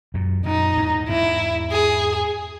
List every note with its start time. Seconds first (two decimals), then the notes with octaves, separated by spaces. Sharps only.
0.14 F#2 A#2
0.46 F#2 A#2 D#4
0.77 E2 G#2
1.09 E2 G#2 E4
1.72 G#4